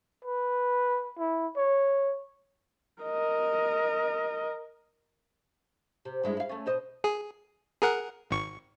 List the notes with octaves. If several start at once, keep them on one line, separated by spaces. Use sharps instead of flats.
B4
E4
C#5
A#4 D#5
C3
G2 G#3 E4
E4 F5
A3 C#4
B2 C5 D#5
G#4
G#4 A#4 F#5
G#1 C#6